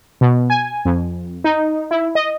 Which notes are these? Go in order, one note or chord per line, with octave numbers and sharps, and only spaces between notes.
B2
G#5
F2
D#4
E4
D#5